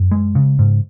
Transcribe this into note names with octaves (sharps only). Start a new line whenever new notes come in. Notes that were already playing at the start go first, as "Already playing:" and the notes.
Already playing: F#2
G#3
C#3
G#2